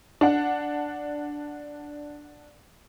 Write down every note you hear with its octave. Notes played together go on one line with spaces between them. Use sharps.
D4 F#5